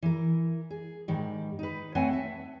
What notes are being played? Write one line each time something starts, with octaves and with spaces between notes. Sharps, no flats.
E3 A#4
G#4
G#2 D#3 G3
D#4 B4
A3 C4 B4 C#5 F#5 G#5
E5 A5